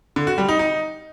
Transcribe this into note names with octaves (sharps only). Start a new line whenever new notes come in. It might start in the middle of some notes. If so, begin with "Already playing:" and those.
D3
F#4
G3
D#4
D#4